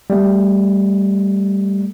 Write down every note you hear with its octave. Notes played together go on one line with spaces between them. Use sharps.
G3 A3